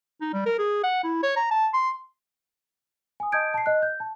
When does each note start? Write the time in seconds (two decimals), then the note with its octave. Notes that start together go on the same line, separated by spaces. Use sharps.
0.21 D#4
0.33 G3
0.46 A#4
0.59 G#4
0.84 F#5
1.04 E4
1.23 C#5
1.36 A#5
1.51 A5
1.73 C6
3.20 G#5 D#6
3.32 D#5 A5 D#6 G6 G#6 D7
3.54 A5 C7
3.66 D#5 F#6
3.82 G6
4.00 A5